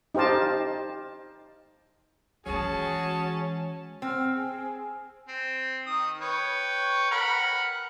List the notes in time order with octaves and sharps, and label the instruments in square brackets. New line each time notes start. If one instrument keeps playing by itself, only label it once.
[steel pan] D#4 G4 C5 F5 A5
[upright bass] E3 G#3 [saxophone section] C#4 [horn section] F#4 G#4 [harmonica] A5
[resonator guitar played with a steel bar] C4 [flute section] F#5 E6 F6
[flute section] G#4
[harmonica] C4
D#3 D#6
B4 C#5 G5
A#4 F#5 B5